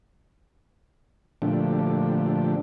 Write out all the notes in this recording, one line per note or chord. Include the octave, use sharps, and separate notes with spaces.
A#2 D3 F3 A3 D4 G4